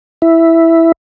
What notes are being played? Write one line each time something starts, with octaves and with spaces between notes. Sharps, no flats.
E4